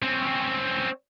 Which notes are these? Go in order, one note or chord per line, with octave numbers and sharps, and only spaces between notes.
C4 C#4